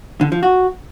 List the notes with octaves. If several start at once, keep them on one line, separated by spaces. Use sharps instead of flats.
D3
F3
F#4